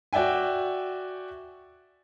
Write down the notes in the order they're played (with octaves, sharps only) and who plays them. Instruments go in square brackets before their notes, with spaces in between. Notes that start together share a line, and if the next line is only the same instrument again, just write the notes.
[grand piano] F#4 D5 E5 G5 G#5